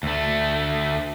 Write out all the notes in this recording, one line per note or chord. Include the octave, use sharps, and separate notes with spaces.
D2 A3